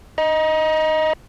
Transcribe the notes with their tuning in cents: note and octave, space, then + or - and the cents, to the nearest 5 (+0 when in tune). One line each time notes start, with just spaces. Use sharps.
D#5 +5 A#5 +30